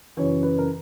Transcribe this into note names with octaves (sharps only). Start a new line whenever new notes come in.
F#2 C#3 E3 C#5
B4
A#4